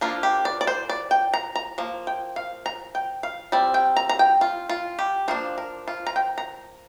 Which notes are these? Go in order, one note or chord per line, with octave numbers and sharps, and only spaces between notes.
F3 A#3 D4 F4
G4
D5
D5
C5
D5
G5
A#5
A#5
F3 A#3
G5
F5
A#5
G5
F5
G3 C4 D5
G5
A#5
A#5
G5
F4
F4
G4
F3 A#3 D4 C5
A#4
F4
A#5
G5
A#5